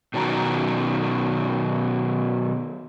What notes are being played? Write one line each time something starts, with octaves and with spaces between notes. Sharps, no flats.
B2 D#3 F#3 G#5 A#5